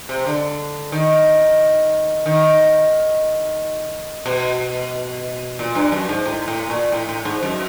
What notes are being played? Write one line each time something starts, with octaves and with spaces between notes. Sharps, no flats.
C3
D3
D#3
D#3
B2
A#2
G2
F#2
G#2
A2
A2
A#2
A2
A2
G#2
F#2